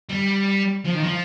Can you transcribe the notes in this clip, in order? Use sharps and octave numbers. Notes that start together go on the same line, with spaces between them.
G3
F3
D#3
F3